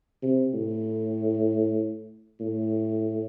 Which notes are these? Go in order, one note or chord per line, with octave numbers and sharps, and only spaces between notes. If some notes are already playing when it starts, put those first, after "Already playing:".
C3
A2
A2